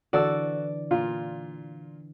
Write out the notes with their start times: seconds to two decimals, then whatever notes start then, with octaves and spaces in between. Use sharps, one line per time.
0.13 D3 E3 D4 F#4 A4 D5 E6
0.91 A#2 F4